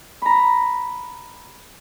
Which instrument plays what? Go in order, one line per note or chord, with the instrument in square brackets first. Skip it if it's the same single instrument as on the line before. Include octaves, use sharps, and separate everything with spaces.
[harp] A#5 B5